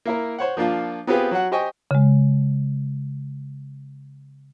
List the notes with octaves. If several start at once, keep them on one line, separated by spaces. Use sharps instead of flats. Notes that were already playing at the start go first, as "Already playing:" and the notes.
A#3 E4 A#4
C5 C#5 F#5
F3 A#3 D4 F4
B3 C4 F4 G4 G#4 B4
F#3 F#4 F#5
G4 C5 D#5 G5 G#5 C#6
C#3 G#3